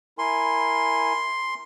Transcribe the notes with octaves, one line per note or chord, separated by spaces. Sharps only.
E4 A#4 G#5 C6